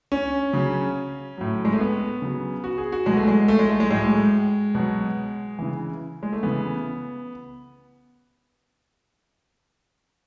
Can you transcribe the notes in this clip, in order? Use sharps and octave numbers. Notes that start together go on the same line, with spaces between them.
C#4
C#3 F#3
A2 F#3
G#3
A3
B3
C#3 F#3
F#4
G#4
F#4
B2 F#3 G#3
A3
G#3
A3
G#3
A3
G#3
A2 F#3 G#3
B2 F#3
C#3 E3
G#3
A3
C#3 E3 B3